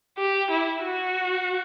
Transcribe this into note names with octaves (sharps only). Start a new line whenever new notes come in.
G4
E4
F#4